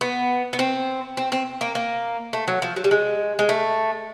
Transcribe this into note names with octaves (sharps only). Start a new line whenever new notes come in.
B3
B3
C4
C4
C4
A#3
A#3
A3
F#3
F3
F#3
G3
G#3
G#3
A3